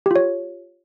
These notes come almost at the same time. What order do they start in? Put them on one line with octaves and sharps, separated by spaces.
G4 F4 C#5